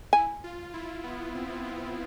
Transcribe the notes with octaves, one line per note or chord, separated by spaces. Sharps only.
E4 G#5
F4
E4
B3
C4
B3